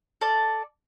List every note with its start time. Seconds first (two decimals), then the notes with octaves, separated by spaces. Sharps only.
0.21 A4 D5